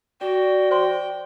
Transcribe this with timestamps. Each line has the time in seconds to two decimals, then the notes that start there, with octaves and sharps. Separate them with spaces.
0.21 F#4 D5 G5
0.71 C5 G5 C6